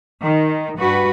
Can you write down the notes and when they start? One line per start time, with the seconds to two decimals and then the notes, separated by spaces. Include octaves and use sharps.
0.22 D#3
0.78 G2 F#4 B4